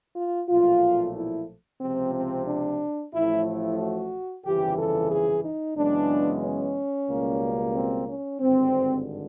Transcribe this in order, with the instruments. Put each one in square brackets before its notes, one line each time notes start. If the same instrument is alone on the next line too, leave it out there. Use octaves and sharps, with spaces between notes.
[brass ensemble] F4
B1 A#2 F3 A3 F4
E4
C#2 C3 F3 C4
C4
D4
A1 A2 F3 A3 E4
E4
F#4
G1 F2 C#3 E3 G4
A4
G#4
D#4
F#2 C#3 E3 G#3 B3 D4
C#4
C#2 B2 G3 A#3
C4
C#4
G#1 G2 D3 C4